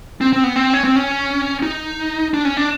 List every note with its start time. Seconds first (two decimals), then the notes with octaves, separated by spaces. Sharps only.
0.21 C4
0.33 C4
0.44 B3
0.56 C4
0.74 C#4
0.84 C4
0.96 C#4
1.63 D#4
2.34 D4
2.45 C#4
2.57 D4